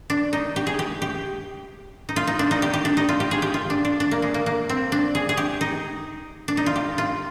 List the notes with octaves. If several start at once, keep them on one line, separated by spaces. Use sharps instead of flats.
D4
D#4
G4
G#4
G4
G4
D#4
F4
D#4
D4
D#4
G4
G4
D4
D#4
F4
G4
G#4
G4
F4
D4
D4
D4
A#3
G#3
A#3
A#3
C4
D4
G#4
G#4
G4
D#4
D4
D#4
F4
G4
F4